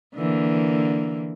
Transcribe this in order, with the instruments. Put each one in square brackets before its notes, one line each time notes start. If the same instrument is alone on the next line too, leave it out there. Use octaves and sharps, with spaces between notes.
[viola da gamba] D3 E3 A#3